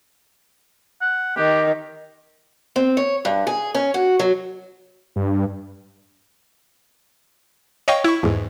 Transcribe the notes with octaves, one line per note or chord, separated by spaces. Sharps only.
F#5
D#3 G4
C4
C#5
G2
G#4
C#4
F#4
F#3
G2
C#5 D#5 F5 G5 C#6
E4 C#6
E2 G#2